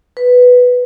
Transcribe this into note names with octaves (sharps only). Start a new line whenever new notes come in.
B4